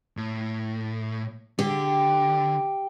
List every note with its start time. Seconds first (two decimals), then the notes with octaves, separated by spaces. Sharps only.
0.17 A2
1.59 D3 G4